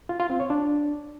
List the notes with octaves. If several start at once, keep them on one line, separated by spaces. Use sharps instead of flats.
F4
F4
C4
C#5
D4